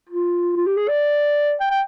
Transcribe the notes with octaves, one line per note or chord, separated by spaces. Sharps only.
F4
F4
G4
G#4
D5
G5
G5